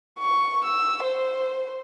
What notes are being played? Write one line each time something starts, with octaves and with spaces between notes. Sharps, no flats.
C#6
E6
C5